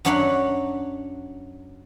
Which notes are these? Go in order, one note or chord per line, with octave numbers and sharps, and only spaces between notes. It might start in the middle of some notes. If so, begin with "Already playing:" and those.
F#2 F#3 D4 C#5 F#5 B5